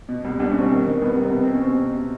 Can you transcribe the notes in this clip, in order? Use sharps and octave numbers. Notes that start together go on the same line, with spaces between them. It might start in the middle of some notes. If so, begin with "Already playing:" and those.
B2
C2
C2 D4
C#4
B2
C4
D#3
D#3
C2 B3
B3
C3
C4
B2 B3
C4
B2
C#4
B2 C4
B2